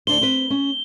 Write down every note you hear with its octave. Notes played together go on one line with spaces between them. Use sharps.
D2 D4 C5 G7
C4 B4
C#4